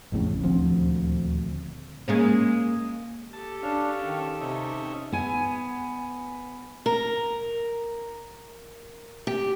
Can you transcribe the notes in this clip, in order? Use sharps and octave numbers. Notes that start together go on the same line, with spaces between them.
A1 F2 A2 C#3
D#1 D2 F3 C4
G#3 A#3 C#4
G4 A4 A5
C#4 D4 F5
D#3
C3 C#4 D#4 E5
B3 G#5
A#4
G4